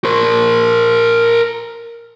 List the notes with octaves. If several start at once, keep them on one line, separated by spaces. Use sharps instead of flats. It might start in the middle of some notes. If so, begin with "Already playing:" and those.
A#4 C5